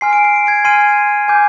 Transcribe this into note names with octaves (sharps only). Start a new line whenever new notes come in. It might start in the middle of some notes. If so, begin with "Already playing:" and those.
G#5 C6 F6 C7
D7
C7
D7
G#6 C7
G#5 C6 F6 C7 D#7
G#5 D6 G6